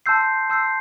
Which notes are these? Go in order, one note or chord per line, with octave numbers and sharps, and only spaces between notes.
A5 C6 E6 G6 C7
A5 C6 E6 G6 C7